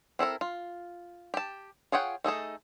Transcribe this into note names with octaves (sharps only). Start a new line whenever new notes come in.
C4 E4 A4 A#4
F4
G4 A5
F4 G#4 C#5 F#5 G5
A3 D#4 G#4 A4